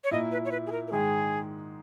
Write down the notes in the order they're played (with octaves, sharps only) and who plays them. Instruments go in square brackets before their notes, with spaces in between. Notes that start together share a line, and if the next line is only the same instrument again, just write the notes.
[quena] C#5
[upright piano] A#2 A#3 E4 [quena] D#5
[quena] B4
C#5
B4
G#4
A#4
A#4
[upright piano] G#2 D#3 G#3 [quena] G#4